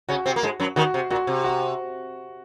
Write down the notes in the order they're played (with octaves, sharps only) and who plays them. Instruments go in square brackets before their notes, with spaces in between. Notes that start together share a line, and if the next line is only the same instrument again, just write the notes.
[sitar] C#3 C#4 [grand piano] F#4
[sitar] C3 C4
A#3
G#2 G#3
F#2 F#3
[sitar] D#2 D#3 [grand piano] F#4
[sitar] C3
[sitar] A#2 [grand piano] F#4
[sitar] C3
[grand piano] F#4